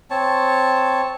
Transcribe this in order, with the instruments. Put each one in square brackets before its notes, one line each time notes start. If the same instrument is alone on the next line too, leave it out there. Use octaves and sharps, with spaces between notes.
[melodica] C4 C#5 A5